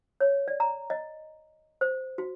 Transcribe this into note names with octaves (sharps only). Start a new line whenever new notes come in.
C#5
D5
A#5
D#5
C5
F#4